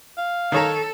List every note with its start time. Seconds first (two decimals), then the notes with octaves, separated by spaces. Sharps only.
0.18 F5
0.52 D#3 A4 C#5 A#5